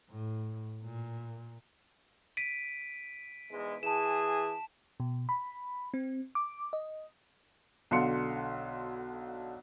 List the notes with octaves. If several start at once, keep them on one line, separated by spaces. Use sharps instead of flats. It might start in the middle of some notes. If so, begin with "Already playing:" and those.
A2
A#2
B6 D7 D#7
E2 G#2 G#3
E3 G#4 A5 E7
B2
B5
C4
D6
D#5
B1 D3 F#4 F5 C6 C#7